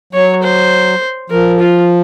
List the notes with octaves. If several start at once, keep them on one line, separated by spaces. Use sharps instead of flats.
F#3 C#5
C5
F3 A#4
F4